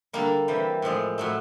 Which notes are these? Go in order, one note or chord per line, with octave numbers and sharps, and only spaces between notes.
D3 G3 A#3
C3 E3 G3
A2 F3 G#3
A2 F#3 A3